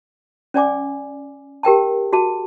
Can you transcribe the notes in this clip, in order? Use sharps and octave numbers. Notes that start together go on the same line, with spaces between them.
C#4 D5 G#5 D6
G4 A#4 G5 A5
F#4 G#4 A5